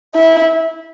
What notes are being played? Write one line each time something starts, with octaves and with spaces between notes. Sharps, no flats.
E4